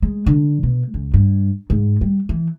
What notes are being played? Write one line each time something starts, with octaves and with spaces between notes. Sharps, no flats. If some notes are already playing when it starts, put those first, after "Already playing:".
G#3
D3
B2
C#2
G2
G#2
G3
E3